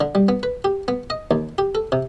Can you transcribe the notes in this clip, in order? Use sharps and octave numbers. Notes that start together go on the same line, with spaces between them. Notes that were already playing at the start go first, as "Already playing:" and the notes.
D3
G3
B3
B4
G4
B3
D#5
D#2
G4
A4
C3